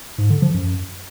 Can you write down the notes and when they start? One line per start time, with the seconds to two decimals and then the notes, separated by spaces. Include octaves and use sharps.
0.18 G#2
0.30 D3
0.42 F3
0.54 F#2